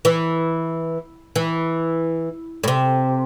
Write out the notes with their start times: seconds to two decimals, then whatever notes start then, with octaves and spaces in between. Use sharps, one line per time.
0.05 E3
1.36 E3
2.63 A2
2.68 C3